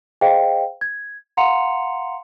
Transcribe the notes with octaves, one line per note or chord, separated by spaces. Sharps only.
G#4 C5 D#5 F5 G5
G#6
F5 F#5 A#5 C6 C#7 F7